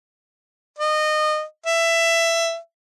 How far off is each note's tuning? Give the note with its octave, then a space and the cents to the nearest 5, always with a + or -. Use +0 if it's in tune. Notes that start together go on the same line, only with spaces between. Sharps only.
D#5 -25
E5 +15